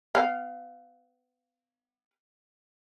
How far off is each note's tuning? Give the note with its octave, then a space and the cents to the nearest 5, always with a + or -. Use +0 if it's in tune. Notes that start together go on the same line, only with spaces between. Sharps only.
B3 +30 F5 +0